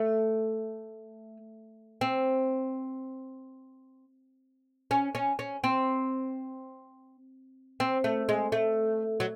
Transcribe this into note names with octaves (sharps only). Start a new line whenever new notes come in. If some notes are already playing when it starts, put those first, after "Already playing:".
Already playing: A3
C4
C#4
C#4
C#4
C4
C4
A3
G#3
A3
F#3